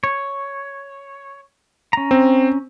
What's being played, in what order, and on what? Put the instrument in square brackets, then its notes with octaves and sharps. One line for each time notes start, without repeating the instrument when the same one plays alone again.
[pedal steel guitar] C#5
C#4 A#5
[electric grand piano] C4